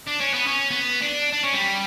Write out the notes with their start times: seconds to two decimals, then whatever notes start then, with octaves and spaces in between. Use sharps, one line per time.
0.08 D4
0.21 C#4
0.34 B3
0.47 C#4
0.71 B3
1.02 D4
1.33 D4
1.44 C#4
1.53 G3